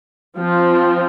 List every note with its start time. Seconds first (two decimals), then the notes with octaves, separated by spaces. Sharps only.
0.37 F3 C4